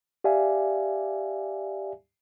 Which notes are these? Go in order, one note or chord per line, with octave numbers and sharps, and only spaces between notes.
G4 D5 E5 F5 G#5